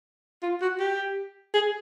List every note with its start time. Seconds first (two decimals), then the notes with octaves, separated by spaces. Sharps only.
0.43 F4
0.62 F#4
0.80 G4
1.54 G#4